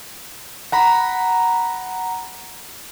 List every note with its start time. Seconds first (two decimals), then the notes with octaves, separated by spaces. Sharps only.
0.72 F#5 A#5 B5